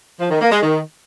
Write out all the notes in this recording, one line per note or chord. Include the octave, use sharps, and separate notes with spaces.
F3
D#3
A#3
G#3
D#3